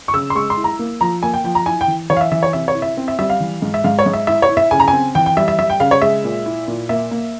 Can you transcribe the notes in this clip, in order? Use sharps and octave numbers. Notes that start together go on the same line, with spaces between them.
C#6
C#3 E6
C6
G#3 C#6
C6
E4
A#5
A#3
F3 A#5
A#3 G#5
G5
F3 G5
A#5
E4 G#5
G5
E3
E3 C#5
F5
E5
E3 E5
C#5
C3 E5
C#5
E4
E5
C4
E5
G3 E5
F5
E3
G#2
E5
G#2 F5
C#5
G#2
E5
E4 E5
C#5
E4
E5
C#3 G#5
A#5
G#5
C4
E3 G5
G5
G3 E5
E5
G3 E5
G5
C#3 F5
C#5
G#3 E5
A#2
E4
A#2
A#3 E5
A#3